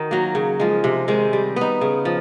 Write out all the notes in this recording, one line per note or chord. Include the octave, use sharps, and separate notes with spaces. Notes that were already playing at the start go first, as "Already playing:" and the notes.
Already playing: D#3 D#4 F#4
F#3 A#3
C#3
F3 G#3
C3
D#3 G#3 C4
G3
B3 D#4
C#3
F3